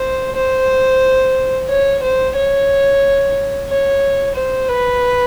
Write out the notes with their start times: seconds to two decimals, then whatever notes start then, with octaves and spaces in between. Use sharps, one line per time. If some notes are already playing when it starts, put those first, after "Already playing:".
Already playing: C5
0.36 C5
1.69 C#5
2.02 C5
2.36 C#5
3.68 C#5
4.35 C5
4.68 B4